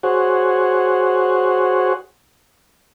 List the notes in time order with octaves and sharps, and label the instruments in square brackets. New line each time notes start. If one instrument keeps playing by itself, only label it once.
[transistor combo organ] F#4 G#4 C5 C#5 F#5